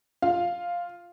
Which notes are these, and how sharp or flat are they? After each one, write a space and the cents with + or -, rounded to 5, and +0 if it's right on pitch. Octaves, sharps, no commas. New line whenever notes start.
F4 +0 F5 +0